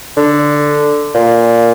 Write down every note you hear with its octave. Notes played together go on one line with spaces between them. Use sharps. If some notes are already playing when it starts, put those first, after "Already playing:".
D3
A#2